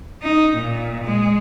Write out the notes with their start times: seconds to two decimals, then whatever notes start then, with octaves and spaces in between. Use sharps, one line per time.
0.23 D#4
0.57 A#2
1.05 G#3